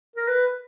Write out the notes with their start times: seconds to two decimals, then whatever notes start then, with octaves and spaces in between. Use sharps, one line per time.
0.16 A#4
0.28 B4